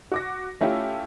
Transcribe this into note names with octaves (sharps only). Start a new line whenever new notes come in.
F#4 D6 A#6
A3 C#4 E4 F4 G4